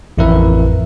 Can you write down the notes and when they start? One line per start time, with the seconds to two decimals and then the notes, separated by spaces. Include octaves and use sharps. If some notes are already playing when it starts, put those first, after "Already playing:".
0.18 A1 F2 E4 A#4 B4 E5